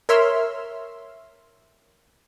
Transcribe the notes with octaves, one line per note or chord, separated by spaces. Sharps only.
A#4 C#5 E5 C6 E6 F6